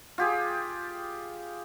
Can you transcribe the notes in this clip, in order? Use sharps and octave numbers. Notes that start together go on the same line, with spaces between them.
F4 G4 G#4